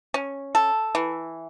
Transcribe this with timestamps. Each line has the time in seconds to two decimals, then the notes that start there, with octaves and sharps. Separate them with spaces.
0.14 C#4
0.55 A4
0.95 E3